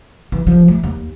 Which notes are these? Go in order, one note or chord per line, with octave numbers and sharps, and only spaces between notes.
E3
F3
A3
D#2